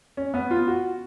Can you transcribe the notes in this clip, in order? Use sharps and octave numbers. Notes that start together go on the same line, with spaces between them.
C#4
B3
F4
F#4